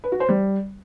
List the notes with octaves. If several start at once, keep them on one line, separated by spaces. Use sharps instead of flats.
B4
F#4
C5
G3